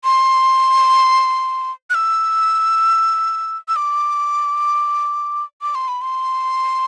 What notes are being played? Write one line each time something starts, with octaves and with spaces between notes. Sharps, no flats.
C6
F#6
E6
E6
D6
D6
C6
B5
C6